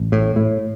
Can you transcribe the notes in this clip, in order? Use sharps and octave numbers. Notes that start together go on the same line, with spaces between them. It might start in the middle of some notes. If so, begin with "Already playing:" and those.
Already playing: A1
A2
A2